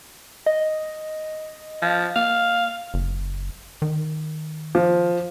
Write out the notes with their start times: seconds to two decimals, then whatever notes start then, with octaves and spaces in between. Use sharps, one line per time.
0.46 D#5
1.82 F3
2.16 A#3 F5
2.94 F#1
3.82 D#3
4.75 F3